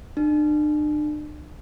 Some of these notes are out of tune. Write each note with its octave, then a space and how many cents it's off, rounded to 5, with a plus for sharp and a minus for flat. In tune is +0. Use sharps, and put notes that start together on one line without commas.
D4 +40